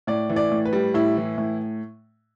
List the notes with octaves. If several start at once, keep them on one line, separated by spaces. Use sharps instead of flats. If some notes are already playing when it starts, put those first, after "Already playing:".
A2 D5
E3
D5
A2
B4
G3
A2 E4
E3
A2